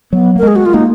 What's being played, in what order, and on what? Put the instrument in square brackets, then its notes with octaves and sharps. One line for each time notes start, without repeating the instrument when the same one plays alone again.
[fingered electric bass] F#3 [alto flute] B3
[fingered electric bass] A#3 [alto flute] A#4
[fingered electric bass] G#3 [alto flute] G#4
[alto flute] F#4
F4
[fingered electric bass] A#3 [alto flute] D#4